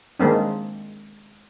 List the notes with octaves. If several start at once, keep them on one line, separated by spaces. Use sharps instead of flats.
D#3 G#3 A#3 C4 D4